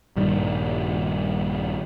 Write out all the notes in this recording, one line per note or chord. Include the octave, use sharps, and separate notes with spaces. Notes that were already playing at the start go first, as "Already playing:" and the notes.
A#1 G2 D#3 G3